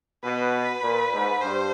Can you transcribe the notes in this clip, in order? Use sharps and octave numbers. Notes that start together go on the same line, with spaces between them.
B2 B4
A#2
G#2
G2 C5